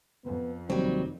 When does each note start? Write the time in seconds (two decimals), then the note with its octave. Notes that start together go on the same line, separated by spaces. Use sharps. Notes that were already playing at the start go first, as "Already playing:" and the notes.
0.25 F2 B3
0.70 F1 D#2 F#3 G3 C4 D#4